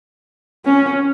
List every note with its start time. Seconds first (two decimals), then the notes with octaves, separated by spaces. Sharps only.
0.66 C#4